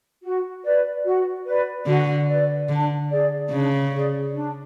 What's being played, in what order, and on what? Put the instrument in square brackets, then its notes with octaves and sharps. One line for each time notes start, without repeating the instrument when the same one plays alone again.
[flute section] F#4
B4 D5
F#4
B4 D5
[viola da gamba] D3 [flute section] F#4
[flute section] B4 D5
[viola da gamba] D3 [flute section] D4
[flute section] G#4 D5
[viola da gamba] C#3 [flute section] D4
[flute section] G#4 D5
D4